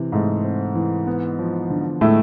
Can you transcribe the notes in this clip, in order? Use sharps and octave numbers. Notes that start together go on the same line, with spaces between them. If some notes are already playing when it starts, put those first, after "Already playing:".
Already playing: C3 E3 C4
G#2 G#3 A3
C4
E3
B3
F3
D3
A2 G#3 A3